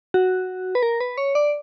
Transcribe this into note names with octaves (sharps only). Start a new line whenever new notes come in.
F#4
B4
A#4
B4
C#5
D5